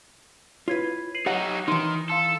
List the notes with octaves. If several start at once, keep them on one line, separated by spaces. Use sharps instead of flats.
E4 F4 B4 C#5 G#6
C7 D#7 F#7
F#3 D#4 G4 C#5 D#5 F#5
D#3 E3 D#4 C6
A4 F5 C6